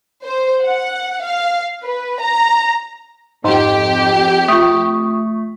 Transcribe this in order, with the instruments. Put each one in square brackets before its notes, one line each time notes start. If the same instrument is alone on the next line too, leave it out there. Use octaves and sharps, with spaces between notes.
[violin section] C5
F#5
F5
B4
A#5
[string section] F2 G4 [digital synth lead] G#2 [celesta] D#5 C6
[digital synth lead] A3 [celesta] F4 C#6 D#6